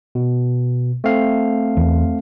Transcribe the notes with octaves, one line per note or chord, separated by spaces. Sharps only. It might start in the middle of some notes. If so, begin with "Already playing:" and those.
B2
A3 C4 F5
E2